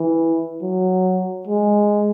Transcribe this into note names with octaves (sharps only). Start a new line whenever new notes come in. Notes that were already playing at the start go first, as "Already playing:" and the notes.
Already playing: E3
F#3
G#3